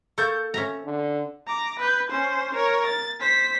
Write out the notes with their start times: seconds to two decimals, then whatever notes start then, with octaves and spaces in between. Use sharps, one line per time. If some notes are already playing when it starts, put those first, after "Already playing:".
0.18 A#3 A4 C#6 G6
0.54 C#4 E5 A#5
0.86 D3
1.47 A#5 D6
1.79 B4 G6
2.11 C#4 C5
2.54 A#4 C#5
2.87 A6
3.20 C5 B6